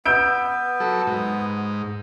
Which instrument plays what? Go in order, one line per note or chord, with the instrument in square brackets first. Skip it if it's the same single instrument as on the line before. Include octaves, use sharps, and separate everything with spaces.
[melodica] B3 B4 [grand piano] E6 G6 D7
[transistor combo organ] F#3 A4
G#2